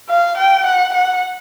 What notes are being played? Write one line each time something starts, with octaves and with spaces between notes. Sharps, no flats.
F5
G5
F#5
F#5